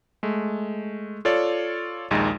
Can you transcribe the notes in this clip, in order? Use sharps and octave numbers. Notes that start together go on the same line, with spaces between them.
G#3 A3
F4 A4 C#5 D5
A#1 D#2 G#3 D#4